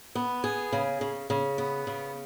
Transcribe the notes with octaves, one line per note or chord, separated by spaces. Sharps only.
B3
G#4
C#3
C#3
C#3
B3
C#3